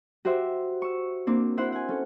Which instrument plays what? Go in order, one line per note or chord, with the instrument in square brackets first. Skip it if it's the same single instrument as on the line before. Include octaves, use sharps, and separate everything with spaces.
[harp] F#4 G4 C5 E5
C#6 E6
A#3 C4 D4
E4 C5 F#5
F#5 G#5
C#4 A4